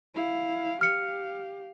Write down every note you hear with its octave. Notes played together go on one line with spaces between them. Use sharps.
E4 F5
G4 F5 F6 C#7